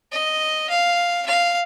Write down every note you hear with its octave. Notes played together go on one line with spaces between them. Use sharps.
D#5
F5
F5